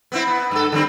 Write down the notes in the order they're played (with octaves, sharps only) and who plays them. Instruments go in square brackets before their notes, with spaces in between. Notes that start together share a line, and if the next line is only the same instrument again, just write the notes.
[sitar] B3 C4 E4
B3
G2 A4
D3 G3 C4